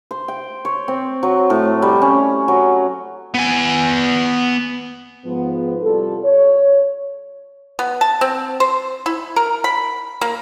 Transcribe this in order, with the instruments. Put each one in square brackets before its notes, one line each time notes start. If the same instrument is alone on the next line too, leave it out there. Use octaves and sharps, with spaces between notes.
[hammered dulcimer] C5
G5
C#5
C4
F#3
A2
G3
C#4
F#3
[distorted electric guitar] B3 G#5
[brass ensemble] G#2 F3 B3
C2 G3 F4 A4
C#5
[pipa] B3
A5
C4
C5
E4
A#4
B5
A#3